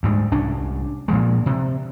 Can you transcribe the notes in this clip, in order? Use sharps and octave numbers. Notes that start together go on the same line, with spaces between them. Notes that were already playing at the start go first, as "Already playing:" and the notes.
D2 G#2 G3
C2 C#4 D4
A#2 F3 G#3
C3